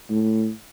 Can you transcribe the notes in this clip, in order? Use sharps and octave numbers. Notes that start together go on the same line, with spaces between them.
A2